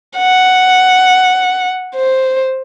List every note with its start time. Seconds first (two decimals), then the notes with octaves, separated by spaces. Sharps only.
0.17 F#5
1.96 C5